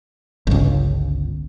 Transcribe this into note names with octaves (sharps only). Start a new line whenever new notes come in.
G1 C#2